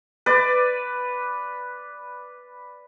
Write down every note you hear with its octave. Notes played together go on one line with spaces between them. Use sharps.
B4 D5